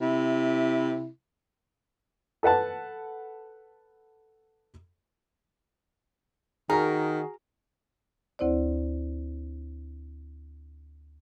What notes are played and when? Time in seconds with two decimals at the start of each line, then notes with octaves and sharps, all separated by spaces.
0.02 C3 E4
2.43 A4 B4 F#5 A5
6.70 D#3 F#4 G#4 A#4
8.39 D2 C4 E4 C5 D5